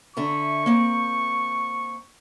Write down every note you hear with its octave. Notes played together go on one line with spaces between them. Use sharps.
D3 E5 A#5 C#6
A#3 C4